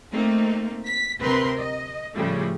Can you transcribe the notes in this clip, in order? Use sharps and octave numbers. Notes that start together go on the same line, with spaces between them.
A3 A#3 C4 D#4
B6
D2 C3 C4 A#4 B4 C6
D#5
A2 C#3 F3 G3 A3